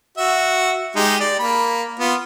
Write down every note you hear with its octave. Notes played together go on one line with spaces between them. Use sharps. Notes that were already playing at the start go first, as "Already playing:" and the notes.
F#4 E5
G#3 D#4 G4
D5
A#3 B5
B3 F4